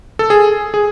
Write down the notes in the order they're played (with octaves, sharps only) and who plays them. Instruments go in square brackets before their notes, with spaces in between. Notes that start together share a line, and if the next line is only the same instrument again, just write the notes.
[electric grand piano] A4
G#4
G#4